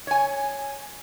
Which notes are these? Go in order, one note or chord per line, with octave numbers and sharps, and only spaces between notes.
C#5 G#5